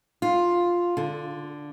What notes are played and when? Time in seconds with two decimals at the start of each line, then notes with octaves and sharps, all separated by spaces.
0.22 F4
0.97 D3